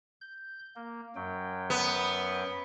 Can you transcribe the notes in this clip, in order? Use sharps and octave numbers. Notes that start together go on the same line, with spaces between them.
G6
A#3
F#2 F#3 G5
B3